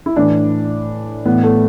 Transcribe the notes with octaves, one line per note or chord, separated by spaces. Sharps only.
E4
A2 E3 D4
A2 E3 B3
A3